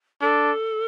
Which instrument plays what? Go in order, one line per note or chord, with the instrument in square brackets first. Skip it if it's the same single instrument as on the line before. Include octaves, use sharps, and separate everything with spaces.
[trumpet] D4 [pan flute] A4